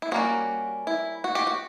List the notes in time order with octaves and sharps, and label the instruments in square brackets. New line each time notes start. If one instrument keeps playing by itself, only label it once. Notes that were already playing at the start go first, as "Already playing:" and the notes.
[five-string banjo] E4
G3 A#3 C#4 F#4
E4
F#4
G4
F#4